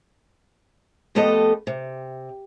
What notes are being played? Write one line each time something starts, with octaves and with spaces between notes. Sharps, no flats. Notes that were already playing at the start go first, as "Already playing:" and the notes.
F2 A3 B3 G4 A4 D#5
C3